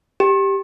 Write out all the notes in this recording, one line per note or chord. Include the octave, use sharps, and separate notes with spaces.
G4